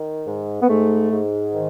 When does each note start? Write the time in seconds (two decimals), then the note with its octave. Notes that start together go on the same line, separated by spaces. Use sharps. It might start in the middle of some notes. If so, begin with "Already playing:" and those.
Already playing: D#3
0.26 G#2
0.61 B3
0.69 G#2 A3
1.11 G#2
1.53 D#3